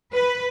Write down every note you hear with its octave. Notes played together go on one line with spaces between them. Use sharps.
B4